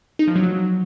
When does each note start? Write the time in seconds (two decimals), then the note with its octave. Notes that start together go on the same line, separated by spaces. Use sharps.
0.19 D#4
0.28 F3
0.36 F#3